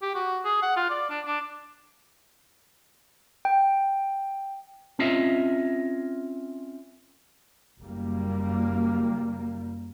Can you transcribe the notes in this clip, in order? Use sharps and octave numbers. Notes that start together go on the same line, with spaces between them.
G4
F#4
G#4
F#5
F4
D5
D4
D4
G5
C4 C#4 F4 D#5 E5
F#1 G3 A#3